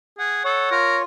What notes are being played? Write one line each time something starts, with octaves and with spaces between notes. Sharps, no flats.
G#4 F#5
A4 C#5
F4 A#4